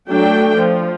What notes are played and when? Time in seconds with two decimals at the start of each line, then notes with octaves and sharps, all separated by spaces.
0.10 F#3 A3 D4 G5
0.57 F3